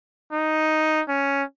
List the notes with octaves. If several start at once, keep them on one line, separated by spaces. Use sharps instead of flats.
D#4
C#4